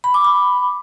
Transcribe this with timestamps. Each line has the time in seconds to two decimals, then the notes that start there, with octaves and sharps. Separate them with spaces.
0.04 B5
0.14 D6
0.25 B5